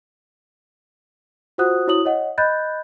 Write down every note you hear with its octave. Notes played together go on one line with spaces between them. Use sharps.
F4 F#4 C5 F#5 D#6 F#6
E4 F#4 C#5 D#6 F#7
C#5 D#5 F#5
D#5 B5 F#6 G6 A6